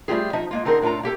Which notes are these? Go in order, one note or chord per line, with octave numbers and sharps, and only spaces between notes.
G3 A3 C4 F4 G4 G#4
F3 D#4 D#5 E5
G#3 A#3 F4
D3 C4 D#4 G#4 A#4 C5
A2 D4 F4 A4 A#5
A#3 G4 A4